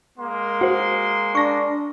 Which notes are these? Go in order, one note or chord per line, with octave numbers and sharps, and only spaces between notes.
G#3 A#3 C6
F#4 C5
D4 C#6 A#6